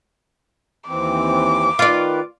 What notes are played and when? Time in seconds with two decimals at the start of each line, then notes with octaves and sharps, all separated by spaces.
0.88 D#2 E3 C4 D6
1.79 D#3 F4 B4 D5